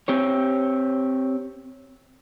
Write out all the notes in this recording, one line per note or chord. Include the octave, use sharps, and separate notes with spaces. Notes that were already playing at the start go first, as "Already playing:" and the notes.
C4 G4 C#5